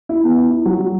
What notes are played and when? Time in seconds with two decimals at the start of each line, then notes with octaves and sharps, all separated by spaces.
0.09 E4
0.24 B3
0.38 E4
0.51 E4
0.65 F#3
0.80 F#3